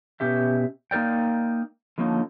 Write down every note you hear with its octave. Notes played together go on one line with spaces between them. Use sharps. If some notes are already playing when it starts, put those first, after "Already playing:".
B2 C#4 G4 E5
A#3 D#4 A#4 D5 G5
D3 F3 A#3 C#4 D#4